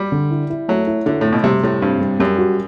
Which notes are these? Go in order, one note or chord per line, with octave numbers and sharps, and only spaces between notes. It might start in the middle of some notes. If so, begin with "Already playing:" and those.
Already playing: G3
D3
E4
E4
F#3 A3
E4
D3 E4
A2 A3
B2
C3 G3
A2 G3
G2 C4
G3
F#2 G3
F#4